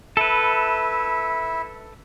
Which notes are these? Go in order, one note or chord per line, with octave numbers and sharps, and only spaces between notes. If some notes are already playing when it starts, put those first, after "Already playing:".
E4 A4 B4 E5